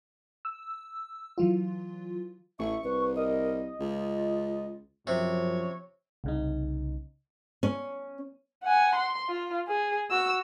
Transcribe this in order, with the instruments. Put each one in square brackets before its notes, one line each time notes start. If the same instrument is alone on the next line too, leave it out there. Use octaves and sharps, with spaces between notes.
[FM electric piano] E6
E3 F#3 F4
[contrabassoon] A1 [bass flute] E5 [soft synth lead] C#6
[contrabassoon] C2 [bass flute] B4
[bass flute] A#4 [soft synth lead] D#5
[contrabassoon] C#2 [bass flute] F4
[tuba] F#2 [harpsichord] C3 [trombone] F3 [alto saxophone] C#5
[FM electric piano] C2 C#3 D#4
[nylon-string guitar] C#4
[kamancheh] F#5 G#5
C6
F4
G#4
F#4 E6